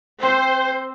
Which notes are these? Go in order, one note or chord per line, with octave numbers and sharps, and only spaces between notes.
C4 C5